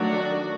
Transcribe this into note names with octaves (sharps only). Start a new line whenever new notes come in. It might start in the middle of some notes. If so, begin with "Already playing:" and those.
Already playing: D#3 F#3 A3 D4 F#4